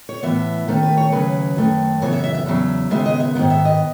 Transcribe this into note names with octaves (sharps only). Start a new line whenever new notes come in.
C#5
A2 E3 B3 E5
D#2 D#3 A3 C#4
B4
C#5
D#2 C#3 F#3 C#4 B4
F#2 D#3 A3
F#2 C#3 E3 B3 C#5
E5
E5
E5
E2 C#3 F#3
D#2 C#3 G#3 B3 E5
D#5
E5
G#2 D#3 F#3 B3 F#5
E5
D#5